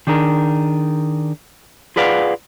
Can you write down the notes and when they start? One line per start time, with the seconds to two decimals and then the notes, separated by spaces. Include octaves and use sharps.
0.07 D#3 D4 G#4 A#4
1.96 F4 G#4 B4 D5 F5 F#5